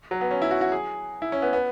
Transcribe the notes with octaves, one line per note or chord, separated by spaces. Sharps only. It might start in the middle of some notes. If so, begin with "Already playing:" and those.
F#3
B3
C#4
E4
F#4
F#4
G#4
E4
C#4
B3
B3